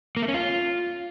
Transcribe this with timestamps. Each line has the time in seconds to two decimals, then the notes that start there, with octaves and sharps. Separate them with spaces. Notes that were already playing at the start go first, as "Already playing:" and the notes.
0.17 A#3
0.22 A3
0.28 C#4
0.34 F4